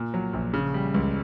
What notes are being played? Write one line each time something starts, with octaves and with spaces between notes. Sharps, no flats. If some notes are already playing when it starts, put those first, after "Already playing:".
Already playing: A#2
F#3
A#1
C#3
G3
C#2